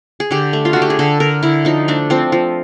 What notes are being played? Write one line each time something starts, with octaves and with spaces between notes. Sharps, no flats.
G#4
D3 G4
A3
F4
D3 F#4
G4
G#4
D3 A4
D3 A#4
D3 E4
F3 D#4
A3 D4
F3 C4
F3